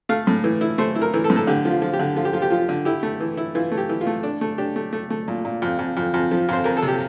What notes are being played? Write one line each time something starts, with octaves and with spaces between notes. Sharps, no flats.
A3 F5
A2
E3
E4
A3 C5
E4
A#4
E3
A4
A2
A4
D3 G4
F3
F4
F3
G4
D3
F3 F4
G4
F3 F4
G4
F3 F4
D3
E4 G4
A3
E3
E4
E3 F4
A3
G4
E3
F4
A3
D4
A3
D4 G4
A3
A3
A3
A#2
A#2
F2
F2
F2
F2
F3
F2 C5
F2 A#4
A4
C3
G4